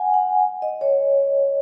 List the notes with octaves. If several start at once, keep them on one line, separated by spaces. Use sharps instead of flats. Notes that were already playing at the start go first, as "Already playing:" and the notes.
Already playing: F#5 G#5
F#5
D#5
C#5